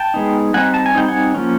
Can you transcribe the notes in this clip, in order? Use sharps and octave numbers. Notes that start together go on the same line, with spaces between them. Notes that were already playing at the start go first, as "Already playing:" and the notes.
Already playing: G5 A5
G#3 B3 D#4
G3 C4 D#4 F#5 G#5
A5
G#5
G3 C4 D#4 G5
F#5 G#5
F3 A#3 C#4